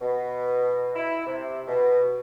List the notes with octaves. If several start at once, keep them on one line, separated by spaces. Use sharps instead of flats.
B2
E4
C3
B2